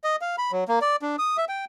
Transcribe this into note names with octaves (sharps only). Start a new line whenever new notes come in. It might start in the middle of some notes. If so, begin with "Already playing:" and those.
D#5
F5
B5
F#3
A#3
D5
D4
D#6
E5
G5